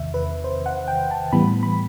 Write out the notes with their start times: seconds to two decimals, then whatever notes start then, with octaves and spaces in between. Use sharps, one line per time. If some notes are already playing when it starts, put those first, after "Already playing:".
Already playing: E2 C3 D#3 E5
0.14 B4
0.44 C5
0.66 F#5
0.88 G5
1.11 A5
1.32 A2 E3 G3 B3 B5
1.63 B5